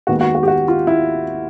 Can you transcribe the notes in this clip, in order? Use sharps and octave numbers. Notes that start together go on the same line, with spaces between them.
D#2 D#3 G#3 B3 F#4
F#4
F#4
G4
F#4
F4
E4